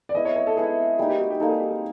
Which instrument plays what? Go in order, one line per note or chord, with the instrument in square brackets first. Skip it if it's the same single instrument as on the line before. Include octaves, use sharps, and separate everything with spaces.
[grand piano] D5
[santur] G#3 B3 E4 [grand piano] D#5
[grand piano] C#5
C#5
A4
[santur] G#3 B3 E4 [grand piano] G#4
[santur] G3 A#3 D#4 [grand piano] G#4
[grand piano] G4
F#4
G4
[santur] G3 A#3 D#4 [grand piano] A4
[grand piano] G#4
G4
G#4